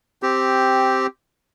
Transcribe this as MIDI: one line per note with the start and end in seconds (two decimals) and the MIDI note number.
0.23 1.07 60
0.23 1.07 67